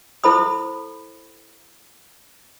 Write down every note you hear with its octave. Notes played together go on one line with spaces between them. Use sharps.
E4 A4 C5 B5 D#6